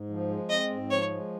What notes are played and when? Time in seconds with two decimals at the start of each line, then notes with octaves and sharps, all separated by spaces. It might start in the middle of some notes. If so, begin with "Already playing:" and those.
Already playing: G#2
0.10 F3
0.29 G#3
0.49 C4 D#5
0.70 G#2
0.89 F3 C#5
1.10 G#3